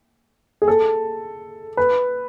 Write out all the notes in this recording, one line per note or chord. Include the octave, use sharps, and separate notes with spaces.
G#4
A4
B4